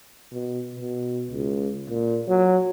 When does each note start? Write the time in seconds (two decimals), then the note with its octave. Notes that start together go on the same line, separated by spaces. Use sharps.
0.32 B2
0.75 B2
1.31 C#2
1.90 A#2
2.28 F#3